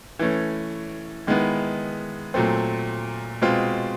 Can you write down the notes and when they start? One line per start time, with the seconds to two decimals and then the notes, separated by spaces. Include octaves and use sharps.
0.19 E3 A3 C#4
1.27 D#3 G#3 B3 E4
2.34 A#2 F#3 A3 C4
3.42 B2 G#3 C4 F4